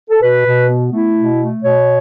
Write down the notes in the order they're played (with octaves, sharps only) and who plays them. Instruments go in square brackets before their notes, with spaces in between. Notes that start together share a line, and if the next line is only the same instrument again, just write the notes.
[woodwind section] A4
B2 B4
B2
B3
A3 E4
B2
A3
B2 C#5